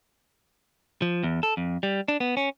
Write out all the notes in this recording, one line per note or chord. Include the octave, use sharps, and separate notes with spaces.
F3
E2
A4
F2
G3
D4
B3
C#4